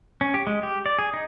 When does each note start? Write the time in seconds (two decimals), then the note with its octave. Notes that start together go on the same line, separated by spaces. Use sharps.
0.21 C#4
0.34 G4
0.47 G#3
0.63 G4
0.86 D5
0.99 G#4
1.14 D#4